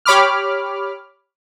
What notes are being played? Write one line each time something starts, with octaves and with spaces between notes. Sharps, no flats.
G4 C#5 B5 D6 F6